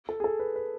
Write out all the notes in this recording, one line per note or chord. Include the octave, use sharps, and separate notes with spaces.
A4
G#4
A4
B4
B4